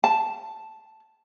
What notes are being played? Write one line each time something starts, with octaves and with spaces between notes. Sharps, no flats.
A5